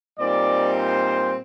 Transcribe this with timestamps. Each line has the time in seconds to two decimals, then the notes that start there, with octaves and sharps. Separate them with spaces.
0.19 A#2 G3 C4 D#4 D5
0.78 C5